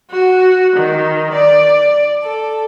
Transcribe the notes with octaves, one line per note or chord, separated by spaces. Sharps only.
F#4
D#3
D5
A4